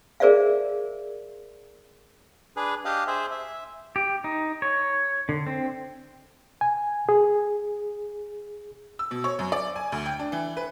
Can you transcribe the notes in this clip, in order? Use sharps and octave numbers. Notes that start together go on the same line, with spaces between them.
G#4 A#4 C5 D5 E5 F5
D4 G#4 B4
D4 G4 D#5 F5
G#4 C5 E5
E5
G4
D#4
C#5
D3
C4
G#5
G#4
E6
B2
C#5
F#2
D5
G#5
D2
G5
D4
E3
B4